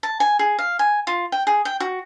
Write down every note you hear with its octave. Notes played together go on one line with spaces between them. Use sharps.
A5
G#5
G#4
F5
G#5
F4
G5
G#4
G5
F#4